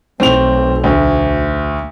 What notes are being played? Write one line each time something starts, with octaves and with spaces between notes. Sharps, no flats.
B1 A3 C4 D#4 F7
D2